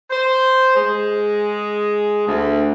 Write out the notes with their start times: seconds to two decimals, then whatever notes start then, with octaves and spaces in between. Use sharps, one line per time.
0.11 C5
0.75 G#3
2.27 D2